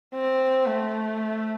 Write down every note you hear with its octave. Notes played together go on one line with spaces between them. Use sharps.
C4
A3